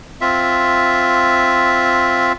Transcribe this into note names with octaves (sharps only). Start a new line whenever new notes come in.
C4 F4 E5